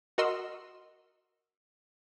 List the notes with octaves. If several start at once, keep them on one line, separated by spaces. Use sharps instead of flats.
F#4 A#4 D#5 C6 E6